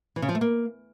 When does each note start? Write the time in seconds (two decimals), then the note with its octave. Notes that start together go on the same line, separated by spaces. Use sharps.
0.16 E3
0.22 C#3
0.29 F3
0.35 A3
0.41 A#3